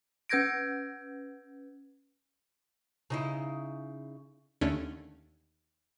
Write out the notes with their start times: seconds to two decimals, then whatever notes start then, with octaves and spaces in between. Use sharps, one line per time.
0.29 C#4 B4 G6 G#6 A#6 D7
3.10 C#3 D#4 E4
4.61 D#2 D3 A3 C#4 D4